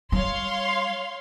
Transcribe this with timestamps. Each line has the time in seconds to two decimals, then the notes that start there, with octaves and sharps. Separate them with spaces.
0.12 G3 C#5 F5 C6